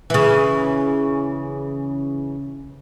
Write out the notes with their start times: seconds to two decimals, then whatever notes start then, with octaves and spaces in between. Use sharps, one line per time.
0.10 C#3 E3